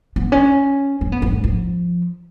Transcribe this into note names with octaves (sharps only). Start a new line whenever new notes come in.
B3
C#4
C#4
B3
A#3
G#3
F3